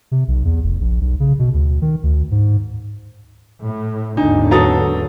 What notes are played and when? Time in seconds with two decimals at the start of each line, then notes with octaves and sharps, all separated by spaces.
0.11 C3
0.28 B1
0.45 E2
0.64 F1
0.81 A#1
1.01 B1
1.20 C#3
1.39 B2
1.54 D2
1.82 D#3
2.03 D2
2.31 G#2
3.61 A2
4.17 G#1 D#2 D3 D4 D#4
4.51 F#3 B3 F#4 A4 F5 A#5 D#6 A6